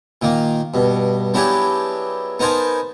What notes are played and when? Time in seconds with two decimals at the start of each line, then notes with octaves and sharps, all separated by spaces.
0.22 A#2 D#3 A#3
0.74 G2 B2
1.34 F#3 B3 D4 E4 G4 G#4
2.39 B3 D#4 A#4 C5 G#5 A5